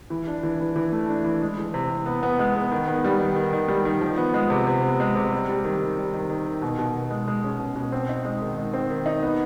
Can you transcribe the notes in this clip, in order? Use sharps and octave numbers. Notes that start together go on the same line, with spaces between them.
E3
D4
E3
E3
E3
A3
D4
E3
G#3
E3
C3
C3
B3
B3
G#3
B3
D#3
B3
G3
D#3
D#3
D#3
G3
D#3
F3
B3
G#3
C3
C3
B3
G#3
C3
G3
G3
D#3
D#3
G3
D#3
D#3
D#3
B2
B2
B2
G#3
G#3
C#4
B2
B2
C4
D#4
G#3
D#3
G#3
C4
D#3
D#4
B3